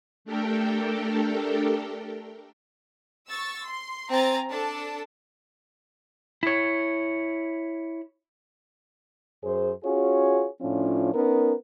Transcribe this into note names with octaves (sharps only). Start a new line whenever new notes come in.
A3 D4 G4 A4 A#4 G5
C#6 E6 A6
C6
C4 G#5 A#5 A6
D4 A4 A5
E4 C#5
F#2 G#4 C5
C#4 F4 F#4 G#4 C#5
A2 F3 C#4 D4 F4
B3 C#4 D#4 A#4